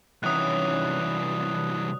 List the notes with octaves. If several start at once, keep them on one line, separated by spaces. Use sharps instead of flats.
C2 D#3 E3 F#3 C#4 D#6 F#6
D4 B4